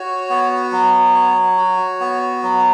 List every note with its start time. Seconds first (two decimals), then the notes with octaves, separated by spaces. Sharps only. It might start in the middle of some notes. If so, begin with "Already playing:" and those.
Already playing: F#4 C#5
0.30 B3
0.72 F#3
1.15 C#5
1.58 F#4
2.00 B3
2.43 F#3